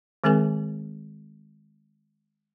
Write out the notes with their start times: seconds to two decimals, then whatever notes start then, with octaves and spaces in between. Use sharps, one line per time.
0.24 D#3 G#3 C4 G#4 A#4 G#5